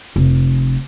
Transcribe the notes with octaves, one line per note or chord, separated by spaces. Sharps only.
F1